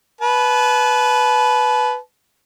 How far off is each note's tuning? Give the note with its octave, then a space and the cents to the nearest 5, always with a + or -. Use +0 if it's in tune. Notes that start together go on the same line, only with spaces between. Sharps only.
B4 +0 A5 -40